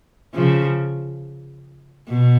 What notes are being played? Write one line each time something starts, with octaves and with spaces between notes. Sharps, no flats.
C#3 F3
B2